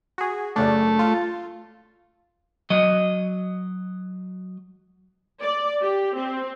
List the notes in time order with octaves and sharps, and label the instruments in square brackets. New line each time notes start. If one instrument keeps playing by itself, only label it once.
[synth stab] F#4 G#4
[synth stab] F#2 C#3 D4 [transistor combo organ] A3
[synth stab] F4
[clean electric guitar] F#3 D#5
[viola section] D5
G4
C4